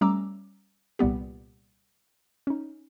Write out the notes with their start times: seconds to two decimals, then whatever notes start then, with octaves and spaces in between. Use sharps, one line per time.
0.01 G3 A3 C#4 A#5 D6 E6
0.99 C2 A#2 G3 B3 G4
2.47 C#4 D#4